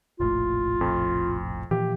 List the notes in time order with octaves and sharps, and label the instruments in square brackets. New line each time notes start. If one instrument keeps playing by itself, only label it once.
[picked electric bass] F1 A#1 A2 [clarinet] F4
[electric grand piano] F2
[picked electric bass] A#2 E3 F3 [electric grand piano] G4